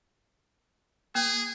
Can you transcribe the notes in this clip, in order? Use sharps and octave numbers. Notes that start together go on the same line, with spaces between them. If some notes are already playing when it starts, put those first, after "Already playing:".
A#3 G#4